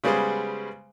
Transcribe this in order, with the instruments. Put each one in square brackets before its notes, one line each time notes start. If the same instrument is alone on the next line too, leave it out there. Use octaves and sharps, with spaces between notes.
[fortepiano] C#3 G3 G#3 B3 G#4 C5